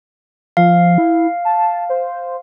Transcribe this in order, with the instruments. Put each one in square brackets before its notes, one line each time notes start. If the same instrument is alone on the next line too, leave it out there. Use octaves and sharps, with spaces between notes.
[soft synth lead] F3 [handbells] F5
[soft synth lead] E4
A5
C5